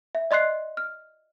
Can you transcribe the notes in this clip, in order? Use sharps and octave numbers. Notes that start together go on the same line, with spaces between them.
E5
D5 D#5 C6 F#6 C7
F6